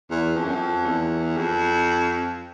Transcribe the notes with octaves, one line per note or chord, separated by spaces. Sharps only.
E2
F2
F#2
F2
E2
F2